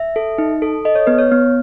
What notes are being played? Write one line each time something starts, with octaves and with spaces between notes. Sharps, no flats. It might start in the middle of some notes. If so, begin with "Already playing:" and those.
Already playing: E5
A4
D#4
A4
A4 D#5
C#5
B3 B4
C#5
B3